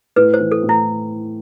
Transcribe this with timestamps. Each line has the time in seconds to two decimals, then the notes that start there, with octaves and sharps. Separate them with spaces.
0.16 A2 B4
0.34 C5
0.40 E3
0.52 A4
0.63 A2
0.69 E4